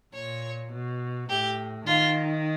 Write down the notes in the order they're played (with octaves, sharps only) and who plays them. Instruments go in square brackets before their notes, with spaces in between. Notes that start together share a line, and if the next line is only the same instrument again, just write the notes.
[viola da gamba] A#2 [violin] C#5
[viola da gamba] B2
[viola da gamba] A2 [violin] G4
[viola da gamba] D#3 [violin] F4